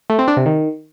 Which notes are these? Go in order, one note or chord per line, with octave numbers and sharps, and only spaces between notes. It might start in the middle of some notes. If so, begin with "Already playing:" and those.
A3
C4
D4
C3
D#3